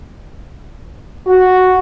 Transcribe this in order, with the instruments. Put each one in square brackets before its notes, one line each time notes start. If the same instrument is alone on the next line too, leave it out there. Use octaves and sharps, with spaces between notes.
[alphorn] F#4